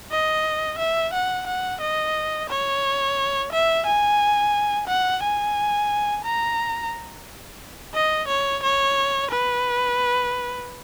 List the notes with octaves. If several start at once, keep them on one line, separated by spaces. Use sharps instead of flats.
D#5
E5
F#5
F#5
D#5
C#5
E5
G#5
F#5
G#5
A#5
D#5
C#5
C#5
B4